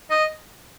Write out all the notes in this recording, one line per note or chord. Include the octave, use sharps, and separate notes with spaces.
D#5